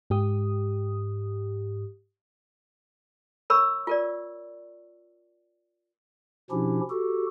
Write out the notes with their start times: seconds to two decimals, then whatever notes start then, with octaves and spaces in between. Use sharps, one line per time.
0.10 G#2 G4 D#6
3.50 A#4 C#5 B5 C#6 E6
3.87 F4 A#4 D5
6.51 B2 F3 C#4 D4 E4 G4
6.90 F#4 G4 A4